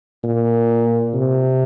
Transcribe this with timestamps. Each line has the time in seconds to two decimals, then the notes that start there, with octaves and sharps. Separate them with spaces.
0.24 A#2
1.14 C3